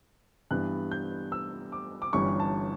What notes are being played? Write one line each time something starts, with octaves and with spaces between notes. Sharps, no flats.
G2 E3 B3 D4 F#6
G6
E6
D6
D6
G1 G2 E3 G3 C#4 C#6
A5